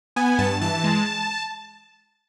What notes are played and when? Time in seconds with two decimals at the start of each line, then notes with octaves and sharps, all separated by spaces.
0.16 B3 G#5
0.38 G2 A5
0.61 E3 A5
0.84 G#3